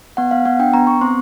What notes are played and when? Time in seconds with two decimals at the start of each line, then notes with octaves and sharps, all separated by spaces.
0.17 B3 F#5
0.31 B3 F5
0.45 B3 F#5
0.59 D4 G5
0.74 B3 A#5
0.87 B3 C#6
1.01 C4 C6